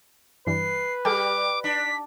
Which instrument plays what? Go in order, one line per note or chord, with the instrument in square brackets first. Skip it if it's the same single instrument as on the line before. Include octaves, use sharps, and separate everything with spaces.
[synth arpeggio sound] G2 E3 G3 [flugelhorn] B4 [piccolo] C7
[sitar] G3 [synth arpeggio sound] G#4 A4 G5 [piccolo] D6
[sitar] D4 [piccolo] B6